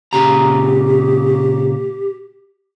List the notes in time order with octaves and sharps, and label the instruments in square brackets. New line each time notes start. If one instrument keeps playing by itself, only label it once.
[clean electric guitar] A#2 C#3 A#5 [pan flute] G4